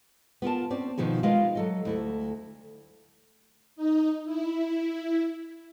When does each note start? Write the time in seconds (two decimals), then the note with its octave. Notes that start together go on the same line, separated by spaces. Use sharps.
0.42 B3 F4 A#4 A5
0.70 C4 C#4 D5
0.97 B2 D#3 F3 B3 G#4
1.23 G#3 F4 A#4 B4 D#5 F5
1.55 F#3 A4 D#5
1.85 D2 E4 A4
3.76 D#4
4.25 E4